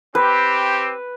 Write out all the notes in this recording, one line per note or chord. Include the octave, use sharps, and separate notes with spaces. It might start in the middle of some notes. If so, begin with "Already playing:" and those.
C4 G4 B4